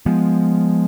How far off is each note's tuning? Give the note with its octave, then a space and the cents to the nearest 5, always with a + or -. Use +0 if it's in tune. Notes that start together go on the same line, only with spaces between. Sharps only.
F3 +0 G#3 +0 B3 +0